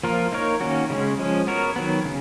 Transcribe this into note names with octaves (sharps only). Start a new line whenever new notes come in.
F3 A#3 F4 A#4
A#3 D#4 A#4 C#5
D#3 A#3 C#4 F#4
C#3 G#3 C#4
F3 G#3 C#4
B3 F#4 A#4 C#5
D#3 F#3 B3
C#3